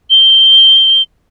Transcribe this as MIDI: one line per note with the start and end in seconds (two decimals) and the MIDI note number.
0.10 1.02 103